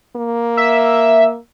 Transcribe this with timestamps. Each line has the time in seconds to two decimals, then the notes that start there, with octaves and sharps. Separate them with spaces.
0.16 A#3
0.57 E5